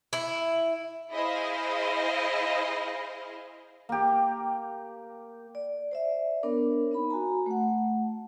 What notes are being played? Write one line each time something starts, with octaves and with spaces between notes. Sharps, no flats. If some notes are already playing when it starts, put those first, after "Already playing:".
E4
E4 G#4 C5 D#5 F5
A#3 G4
D5
C5 D5 E5
B3 D4 A#4 C#5
C4 D#4 B5
F#4 G#5 A#5
A3 F#5